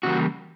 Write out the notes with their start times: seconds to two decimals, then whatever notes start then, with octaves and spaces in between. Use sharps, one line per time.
0.03 C#3 E3 G3 A#3 F#4